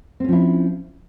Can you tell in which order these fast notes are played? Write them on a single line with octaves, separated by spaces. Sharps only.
C4 C#4 F3 E4